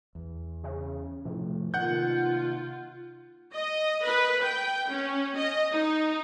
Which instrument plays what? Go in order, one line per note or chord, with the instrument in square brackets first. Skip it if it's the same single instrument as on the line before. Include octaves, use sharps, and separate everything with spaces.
[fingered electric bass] E2
[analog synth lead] C#3
[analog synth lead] A2 [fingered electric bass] C3 F3
[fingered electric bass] C3 A#3 [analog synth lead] D#3 [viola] F4 [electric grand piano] F#5 G6
[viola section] D#5
B4
G5
C#4
D#5
D#4